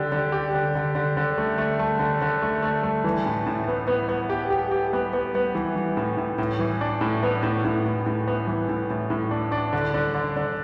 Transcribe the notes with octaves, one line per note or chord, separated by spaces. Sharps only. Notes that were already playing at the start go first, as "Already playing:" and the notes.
Already playing: D3 G4
D3
G4
D3
D3
D3
D3
A3
A3
A3
D3
D3
A3
A3
A3
E3
A2
A2
B3
B3
B3
G4
G4
G4
B3
B3
B3
E3
E3
A2
A2
A2
E3
D4
A2
B3
A2
A2
A2
A2
B3
E3
A2
A2
A2
D4
D4
D3
D3
D3
D3